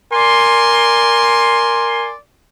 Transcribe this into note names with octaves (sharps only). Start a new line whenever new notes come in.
A#4 D5 G#5 C6